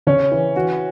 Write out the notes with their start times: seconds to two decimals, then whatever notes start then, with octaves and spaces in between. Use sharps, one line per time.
0.07 C#3 C#4
0.32 E3
0.56 E3 F#4